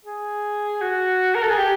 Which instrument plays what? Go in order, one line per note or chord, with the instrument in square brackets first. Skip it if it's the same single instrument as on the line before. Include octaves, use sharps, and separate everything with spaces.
[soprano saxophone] G#4
F#4
A#4
A4
G#4
G4